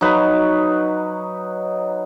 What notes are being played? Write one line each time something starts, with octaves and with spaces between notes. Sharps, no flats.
F#3 D#4 B4